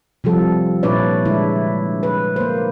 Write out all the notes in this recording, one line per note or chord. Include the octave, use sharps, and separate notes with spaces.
C3 F3 G3 A4
A#2 D4 E4 B4 C#5 D5
D3 G#3 E4
B4
A#3 C5